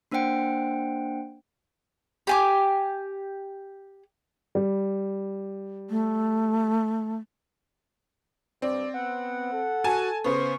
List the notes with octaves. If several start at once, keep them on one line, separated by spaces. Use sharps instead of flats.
A#3 D4 C5 F#5 G5 D7
G4 G#5 D6
G3
A3
G2 C4 D5
B3 F#5
A4
F#4 G#5 A5
C#3 B3 C5 C#6